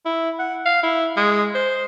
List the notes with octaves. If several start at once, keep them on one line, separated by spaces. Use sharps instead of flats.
E4
F#5
F5
E4
G#3
C5